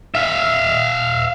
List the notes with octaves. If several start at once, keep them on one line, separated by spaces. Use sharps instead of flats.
E5 F5